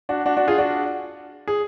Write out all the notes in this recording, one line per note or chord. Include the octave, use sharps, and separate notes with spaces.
D4 F#4
D4 F#4
D4 F#4
F4 G#4
D4 F#4
G#4